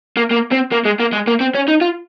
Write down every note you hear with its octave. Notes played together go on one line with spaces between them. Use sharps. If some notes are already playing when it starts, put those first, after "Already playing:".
A#3
A#3
C4
A#3
G#3
A#3
G#3
A#3
C4
C#4
D#4
F4